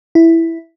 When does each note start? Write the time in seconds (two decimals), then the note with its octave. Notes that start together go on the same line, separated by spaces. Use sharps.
0.15 E4